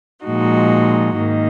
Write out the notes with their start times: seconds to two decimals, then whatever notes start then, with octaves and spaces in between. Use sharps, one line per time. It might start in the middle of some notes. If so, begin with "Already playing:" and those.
0.25 A#2 F3 G#3 D#4 F#4
1.16 G#2 D#3 A#3 D#4